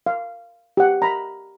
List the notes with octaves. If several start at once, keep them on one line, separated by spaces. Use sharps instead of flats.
F5
G4 F#5
A#5 B5